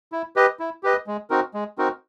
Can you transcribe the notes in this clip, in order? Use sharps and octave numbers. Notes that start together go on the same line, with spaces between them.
E4
G4 B4 D#5
E4
G4 B4 D#5
G#3
C4 D#4 F#4 A#4
G#3
C4 D#4 F#4 A#4